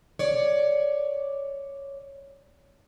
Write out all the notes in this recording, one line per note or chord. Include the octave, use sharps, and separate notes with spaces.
C#5 D5